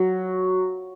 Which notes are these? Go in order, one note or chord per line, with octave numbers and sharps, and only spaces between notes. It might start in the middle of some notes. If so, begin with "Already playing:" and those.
Already playing: F#3